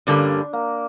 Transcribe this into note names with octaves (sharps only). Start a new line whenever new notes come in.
G2 D3 G3 A#3 C#4 D4
A#3